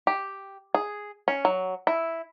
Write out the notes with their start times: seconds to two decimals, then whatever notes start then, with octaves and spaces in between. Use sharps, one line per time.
0.07 G4
0.74 G#4
1.28 C#4
1.45 F#3
1.87 E4